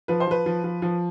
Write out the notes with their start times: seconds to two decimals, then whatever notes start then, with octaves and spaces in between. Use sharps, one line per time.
0.08 F3 B4
0.20 C5
0.27 F3 B4
0.46 F3
0.64 F3
0.82 F3